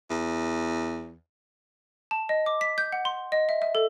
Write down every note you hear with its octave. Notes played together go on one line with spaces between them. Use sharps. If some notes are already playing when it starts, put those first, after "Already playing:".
E2
A5
D#5
D6
B6
G6
F#5
C6
D#5
E5
E5
A4